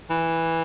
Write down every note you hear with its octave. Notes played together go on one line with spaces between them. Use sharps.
E3